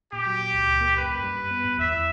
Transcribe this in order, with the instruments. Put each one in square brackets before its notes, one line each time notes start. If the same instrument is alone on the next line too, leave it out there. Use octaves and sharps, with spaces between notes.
[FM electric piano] A#2 [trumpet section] G4
[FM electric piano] F#3
A#2
C#2
C#2
A#3
[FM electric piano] F#2 [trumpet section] B4
[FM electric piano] F#2
G3
G2
B3
G2
[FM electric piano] E2 [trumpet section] E5
[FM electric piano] E3